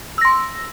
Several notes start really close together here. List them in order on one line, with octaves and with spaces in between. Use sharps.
E6 A#6 C6